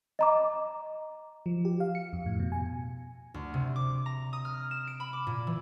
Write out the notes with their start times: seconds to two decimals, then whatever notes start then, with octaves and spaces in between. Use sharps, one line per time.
0.19 D#5 A#5 D6
1.46 F3
1.65 G4
1.80 F5
1.95 C#7
2.13 F2
2.26 A2
2.40 B2
2.52 G#5
3.34 D2
3.54 C3
3.76 D6
4.06 A#5
4.33 D#6
4.45 F6
4.71 E7
4.87 D7
5.00 B5
5.13 D6
5.27 A#2
5.47 E3